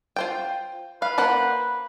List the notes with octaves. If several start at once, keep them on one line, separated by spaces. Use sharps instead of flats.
F4 C5 G5
B4 F5
A#3 C5 F#5